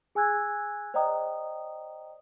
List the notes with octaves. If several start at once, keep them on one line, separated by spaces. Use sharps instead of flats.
G#4 G#5 E6 F#6 G#6
C5 D5 D#5 G5 A#5 D#6